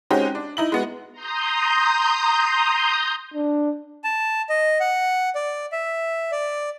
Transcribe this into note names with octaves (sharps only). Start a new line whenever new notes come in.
G#3 C4 C#4 D#4 F#4 G4
D4
D#4 E4 F#7
G#3 B3 F#4
A#5 C6 D#6 G6
D4
A5
D#5
F#5
D5
E5
D5